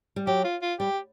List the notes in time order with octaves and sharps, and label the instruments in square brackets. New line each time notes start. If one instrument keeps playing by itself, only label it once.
[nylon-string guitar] G3
[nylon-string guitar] F#3 [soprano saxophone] G4
[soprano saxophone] F4
F4
[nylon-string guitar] G3 [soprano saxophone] G4